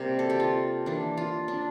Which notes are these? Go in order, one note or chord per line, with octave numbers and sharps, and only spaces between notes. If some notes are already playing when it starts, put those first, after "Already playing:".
Already playing: C3 G3 A#3 G4
A4
G4
F4
E3 A#3 D4
F4
D4